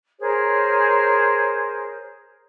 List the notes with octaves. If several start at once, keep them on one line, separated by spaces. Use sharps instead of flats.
G#4 A#4 C5 C#5